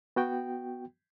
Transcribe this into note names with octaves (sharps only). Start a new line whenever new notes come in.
B3 F#4 G5